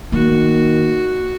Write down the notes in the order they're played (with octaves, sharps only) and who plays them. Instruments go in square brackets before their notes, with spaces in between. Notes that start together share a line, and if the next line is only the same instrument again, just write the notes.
[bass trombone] D#3 [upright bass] A#3 [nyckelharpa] F#4